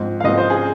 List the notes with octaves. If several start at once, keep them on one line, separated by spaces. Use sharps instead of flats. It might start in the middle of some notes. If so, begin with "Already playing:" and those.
Already playing: G#2 F3 C4
F5
G#2 F3 C4 D#5
C5
G#4